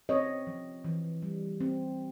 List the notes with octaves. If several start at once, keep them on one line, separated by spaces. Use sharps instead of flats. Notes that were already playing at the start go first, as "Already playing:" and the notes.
C4 C#5 D#5
F3
E3
G3
C4